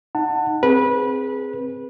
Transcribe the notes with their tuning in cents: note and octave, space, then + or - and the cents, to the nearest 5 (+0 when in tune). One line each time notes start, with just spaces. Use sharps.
D#4 +0 F#5 +0 A5 +25
C4 +0 G#4 +0 B4 -20